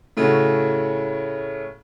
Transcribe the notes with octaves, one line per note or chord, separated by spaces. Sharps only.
A2 C#3 A3 C#4 F#4